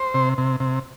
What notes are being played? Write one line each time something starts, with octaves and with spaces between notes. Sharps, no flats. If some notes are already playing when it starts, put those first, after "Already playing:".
Already playing: C5
C3
C3
C3